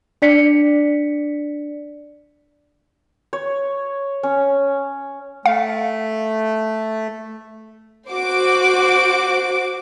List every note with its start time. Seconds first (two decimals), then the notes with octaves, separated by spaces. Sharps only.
0.22 D4 D5 B6 C#7
3.33 C#5
4.23 C#4
5.46 A3 F5
8.11 F#4 C5 D6 D7